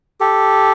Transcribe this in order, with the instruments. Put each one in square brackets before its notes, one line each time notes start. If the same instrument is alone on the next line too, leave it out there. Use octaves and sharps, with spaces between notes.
[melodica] G4 A4